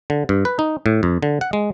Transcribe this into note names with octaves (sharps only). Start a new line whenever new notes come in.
D3
G2
B4
D#4
A2
F2
D3
F#5
G#3